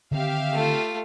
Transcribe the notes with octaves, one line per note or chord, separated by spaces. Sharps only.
D3 D#3 C4 G4 E5 F5
A3 F4